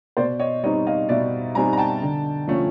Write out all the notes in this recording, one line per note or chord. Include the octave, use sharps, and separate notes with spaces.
B2 C5 D5
C#5 D#5
G3 C4 D#4 C#5 D#5
D#5 F5
B2 D5 E5
G3 C4 D#4 G#5 A#5
A#5
G5 A5
D3
F3 A3 C#4